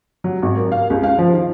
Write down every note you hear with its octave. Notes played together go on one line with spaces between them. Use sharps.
F#3
G#1
A#4
F5
C#2
F5
F3
D#3